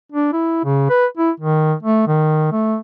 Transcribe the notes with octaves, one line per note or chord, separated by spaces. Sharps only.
D4
E4
C#3
B4
E4
D#3
A3
D#3
A3